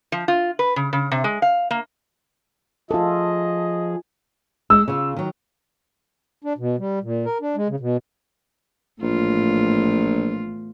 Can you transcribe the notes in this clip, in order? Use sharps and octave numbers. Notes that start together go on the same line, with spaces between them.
F3
F4
B4
C#3
C#3
C3
G#3
F5
A#3
F3 F4 G#4 A4 D#5
G#3 E6
C#3 F4
D#3 F#3
D4
B2
G3
A#2
A#4
D4
G#3
C#3
B2
A#1 E2 A2 F4